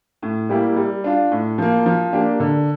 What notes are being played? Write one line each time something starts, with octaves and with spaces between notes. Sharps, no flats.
A2
G3 A#3 E4 G4
G3
D4 F4
A2
F3 A#3
F3
A#3 D4 G4
D3